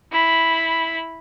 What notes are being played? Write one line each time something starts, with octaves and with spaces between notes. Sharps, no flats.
E4 B5